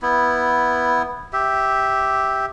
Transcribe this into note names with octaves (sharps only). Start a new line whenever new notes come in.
B3 E4
G4 E5